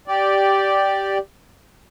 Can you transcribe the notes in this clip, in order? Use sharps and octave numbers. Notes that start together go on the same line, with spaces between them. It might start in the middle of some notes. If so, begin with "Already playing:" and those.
G4 D5